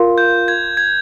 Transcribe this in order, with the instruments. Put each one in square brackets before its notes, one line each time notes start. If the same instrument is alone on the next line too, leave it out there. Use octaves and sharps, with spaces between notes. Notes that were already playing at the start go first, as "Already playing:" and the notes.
Already playing: [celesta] F4 A#4 F5 C6
[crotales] G6
G#6
G#6